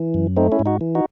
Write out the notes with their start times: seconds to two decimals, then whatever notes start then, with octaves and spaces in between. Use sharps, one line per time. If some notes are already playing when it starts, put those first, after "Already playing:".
Already playing: E3
0.14 F#2
0.37 A3 C4 D#4
0.52 C#4 E4
0.59 G#2
0.66 D#4 F#4
0.81 E3
0.95 D#4 F#4